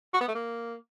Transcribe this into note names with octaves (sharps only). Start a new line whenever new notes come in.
F#4
B3
A3
A#3